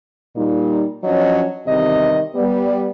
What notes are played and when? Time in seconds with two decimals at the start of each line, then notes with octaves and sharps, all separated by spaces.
0.36 A#2 G3 D#4
1.03 F3 F#3 C#4 D4 D#5
1.66 E2 C3 D#3 G3 C4 D#5
2.35 G3 B3